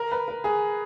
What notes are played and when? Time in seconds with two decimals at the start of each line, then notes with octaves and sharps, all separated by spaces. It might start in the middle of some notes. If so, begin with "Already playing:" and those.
Already playing: A#4
0.12 B4
0.28 A#4
0.44 G#4